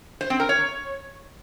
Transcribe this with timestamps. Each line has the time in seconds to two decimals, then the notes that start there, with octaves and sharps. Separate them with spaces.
0.21 C5
0.30 C4
0.40 A#4
0.49 C#5